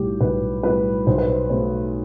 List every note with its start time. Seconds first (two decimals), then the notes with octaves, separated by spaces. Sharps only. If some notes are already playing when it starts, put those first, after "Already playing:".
Already playing: B1 A2 G3 G4
0.20 B1 B4
0.63 A2 G3 B4
1.06 B1 C5
1.18 B4
1.29 C5
1.50 B2 A3 C5